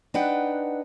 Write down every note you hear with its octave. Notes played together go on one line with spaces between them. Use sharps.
D4 D#4 B4 F#5 G5